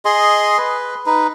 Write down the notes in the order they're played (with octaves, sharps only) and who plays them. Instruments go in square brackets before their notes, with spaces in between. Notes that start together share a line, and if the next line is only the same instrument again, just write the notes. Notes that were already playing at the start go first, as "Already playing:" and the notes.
[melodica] G#4 D#5 C6
B4
D#4 B4